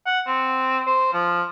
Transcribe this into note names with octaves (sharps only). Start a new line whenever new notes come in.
F#5
C4
C5
F3